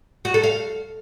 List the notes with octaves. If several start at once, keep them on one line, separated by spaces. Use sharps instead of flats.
F#4
A4
F5